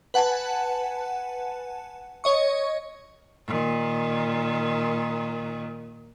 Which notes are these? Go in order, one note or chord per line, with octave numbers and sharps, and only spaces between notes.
B4 F#5 G#5 A5
C#5 D#5 C#6
A#2 D#3